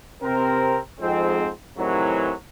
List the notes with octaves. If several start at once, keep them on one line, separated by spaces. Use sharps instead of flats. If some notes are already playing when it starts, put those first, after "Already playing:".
C3 C4 A#4
F2 G#2 G#3 C4
A2 C3 D#3 E3 F#3